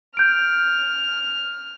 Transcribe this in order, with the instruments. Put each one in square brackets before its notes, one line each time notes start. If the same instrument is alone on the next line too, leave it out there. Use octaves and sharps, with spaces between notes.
[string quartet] F6 [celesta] G6 D7